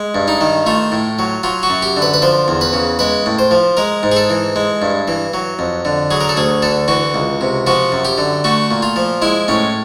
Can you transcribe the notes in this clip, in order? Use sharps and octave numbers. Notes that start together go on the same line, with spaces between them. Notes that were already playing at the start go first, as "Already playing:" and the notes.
Already playing: G#3
G2
D#4
D#3
A3 F4
A2
F#3
F#3 F4
F#4
F#2
G4
D3
B4
B4
F3 C5
E2
B4
C#3
G#3 B4
A2
C5
F3
G#3 A#4
G#2
G#4
A4
E3
G#3
G2
E3
F#3
F2
D3
F#3 G#4
A#4
A4
D2 G#4
D3 A4
E3 F#4
C#2
C3
F3 F#4
F#2
G4
D3
A3 F#4
A#2
F4
F3
G#3 E4
A2 C#4